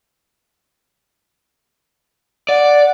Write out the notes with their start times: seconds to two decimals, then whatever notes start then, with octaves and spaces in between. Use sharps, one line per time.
2.49 D5 F#5